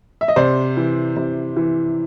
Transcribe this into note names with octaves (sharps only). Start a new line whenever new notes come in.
E5
D#5
C3 C5 D5
E3
C3
E3